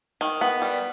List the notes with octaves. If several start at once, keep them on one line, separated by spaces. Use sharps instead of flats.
D#3
B3
G3